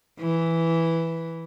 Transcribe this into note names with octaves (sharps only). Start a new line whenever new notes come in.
E3